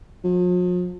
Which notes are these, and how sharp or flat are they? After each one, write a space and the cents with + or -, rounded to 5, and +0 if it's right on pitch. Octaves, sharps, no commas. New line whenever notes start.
F3 +45